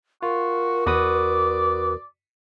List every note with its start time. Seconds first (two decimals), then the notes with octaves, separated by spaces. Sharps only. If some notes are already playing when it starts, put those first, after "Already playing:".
0.23 F4 F#4 A#4
0.86 E2 F#4 B4 D5 D#6